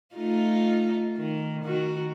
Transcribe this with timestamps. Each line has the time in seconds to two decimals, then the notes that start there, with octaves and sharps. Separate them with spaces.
0.15 A3 D#4 F4
1.18 D#3
1.64 D#3 F#4